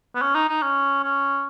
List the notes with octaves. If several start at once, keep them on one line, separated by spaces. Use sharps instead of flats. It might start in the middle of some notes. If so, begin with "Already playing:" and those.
B3
C#4
D#4
D#4
C#4
C#4